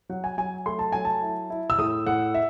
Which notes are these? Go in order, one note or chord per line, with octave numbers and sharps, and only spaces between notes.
F#3 F#5
G#5
F#3 G#5
A3 C6
A5
F#3 G#5
A5
E4
E4
E6
A2 D#6
A2 F#5
E5